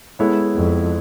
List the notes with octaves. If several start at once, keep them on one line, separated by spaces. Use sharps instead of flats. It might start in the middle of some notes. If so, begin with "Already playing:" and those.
G#3 B3 E4 A4 C#5
F2